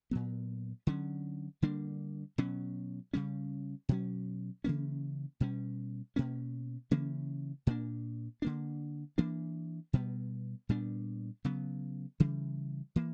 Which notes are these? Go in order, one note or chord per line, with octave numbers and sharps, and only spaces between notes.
A#2 F#3 B3
D3 F#3 C#4
D3 G3 A#3 D4
B2 F#3 C#4
C#3 G3 C#4
B2 F#3 C#4
C#3 E3 A#3 C#4
B2 G3 C#4
B2 A#3 C#4
C#3 E3 A#3 C#4
A#2 A#3 D4
D3 A#3 D4
E3 A#3 D4
B2 G3 B3
A#2 G3 B3 D4
C#3 F#3 B3
C#3 E3 G3
E3 A#3